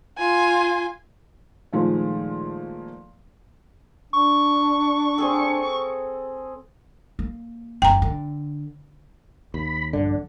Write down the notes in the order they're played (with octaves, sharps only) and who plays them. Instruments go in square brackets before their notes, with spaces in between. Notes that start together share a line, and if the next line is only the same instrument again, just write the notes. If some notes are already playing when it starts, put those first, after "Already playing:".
[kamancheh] F4 G#5
[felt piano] A#2 D#3 F3 G#3 A3
[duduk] D4 [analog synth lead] C#6
[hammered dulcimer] C4 G#4 A4
[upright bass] A#3
[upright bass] F#1 E2 [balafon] G5 A#5
[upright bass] D3
[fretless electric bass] D#2 [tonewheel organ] B5
[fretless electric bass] A#1 D3 [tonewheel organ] G2 D4